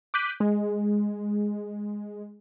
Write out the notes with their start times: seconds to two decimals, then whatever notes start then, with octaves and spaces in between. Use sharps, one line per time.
0.14 D6 F#6 G6 B6 D#7
0.40 G#3